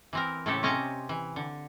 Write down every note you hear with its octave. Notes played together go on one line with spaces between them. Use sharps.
E3 C4 A#4
A2 C#3 A3 C4 G4 A4
C3 C4 C#4 D#5 A5 A#5
E3
D3